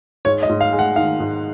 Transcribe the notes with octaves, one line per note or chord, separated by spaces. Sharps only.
G#2 C#5
D#5
G#2
F5
G#3
F#5
D#3 F5
G#2